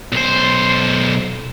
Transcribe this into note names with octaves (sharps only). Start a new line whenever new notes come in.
B1 C5